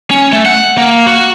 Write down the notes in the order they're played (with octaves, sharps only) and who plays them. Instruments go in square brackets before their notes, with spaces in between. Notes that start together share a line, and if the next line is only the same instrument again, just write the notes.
[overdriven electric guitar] C#4
A3
F#5
A#3
F#4